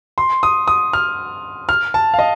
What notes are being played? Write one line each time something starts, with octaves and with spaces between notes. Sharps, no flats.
C6
D#6
D#6
F6
F6
A5
F5
D#5